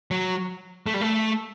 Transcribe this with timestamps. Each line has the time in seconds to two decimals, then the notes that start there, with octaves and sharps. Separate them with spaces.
0.11 F#3
0.87 A3
0.94 G3
1.01 A3